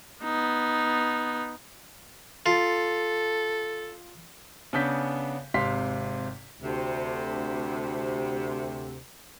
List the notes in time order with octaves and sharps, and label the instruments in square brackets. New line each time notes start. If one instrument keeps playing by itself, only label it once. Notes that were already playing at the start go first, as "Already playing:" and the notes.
[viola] B3 D#4
[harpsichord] F4 [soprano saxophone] A4
[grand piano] C#3 B3 D4 G6 B6
G#1 C3 F5 C6 B6
[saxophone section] D2 C3